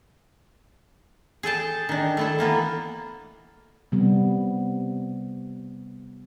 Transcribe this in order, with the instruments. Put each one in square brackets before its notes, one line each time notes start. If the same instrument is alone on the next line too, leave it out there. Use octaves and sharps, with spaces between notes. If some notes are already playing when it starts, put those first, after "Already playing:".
[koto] G#4 A4 G5 A5
D#3 D4
A3 E4 A4
E3 A#3 B3
[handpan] C3 G3 B3